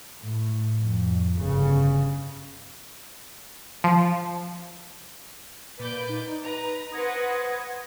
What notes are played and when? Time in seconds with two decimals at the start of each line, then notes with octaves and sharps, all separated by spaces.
0.21 A2
0.82 F2
1.38 G1 C#3
3.84 F3
5.79 A#2 B4 D5 G6
6.09 D#4
6.41 B4 A#5
6.92 B4 C5 F#5 D#6 G#6 A#6